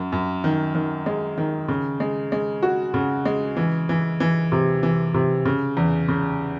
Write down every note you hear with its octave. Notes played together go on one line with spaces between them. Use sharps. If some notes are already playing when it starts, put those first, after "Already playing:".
Already playing: F#2
F#2
D#3
D#3
G#3
D#3
C#3
G#3
G#3
F#4
C#3
G#3
E3
E3
E3
C3
E3
C3
C#3
E2
C#3